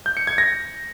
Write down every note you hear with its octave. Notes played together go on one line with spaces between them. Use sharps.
G6
C#7
G#6
A#6